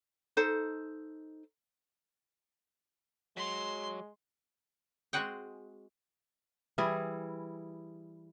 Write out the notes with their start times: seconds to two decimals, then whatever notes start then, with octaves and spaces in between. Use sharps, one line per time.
0.37 D#4 A4 C5
3.37 F#3 G#3 C6
5.13 G#3 C4 F#4 G#4 F#5 G5
6.78 E3 G3 E4 G#4